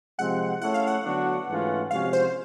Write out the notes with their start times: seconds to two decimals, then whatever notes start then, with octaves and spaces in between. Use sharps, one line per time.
0.18 C3 F3 G#3 C4 F#5
0.62 A3 C#4 E4 A4 C#5 F#5
0.74 F5
0.87 F#5
1.05 D3 F#3 B3 D4 F#4
1.48 G#2 E3 A3 C#4 F4
1.91 C3 F3 G#3 C#4 F#4 F5
2.13 C5